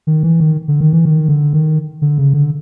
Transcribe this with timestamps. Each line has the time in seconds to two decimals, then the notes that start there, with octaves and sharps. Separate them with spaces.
0.07 D#3
0.23 E3
0.40 D#3
0.68 D3
0.80 D#3
0.93 E3
1.05 D#3
1.28 D3
1.53 D#3
2.02 D3
2.18 C#3
2.33 D3